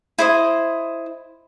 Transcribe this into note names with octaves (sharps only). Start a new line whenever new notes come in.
E4 C5 D#5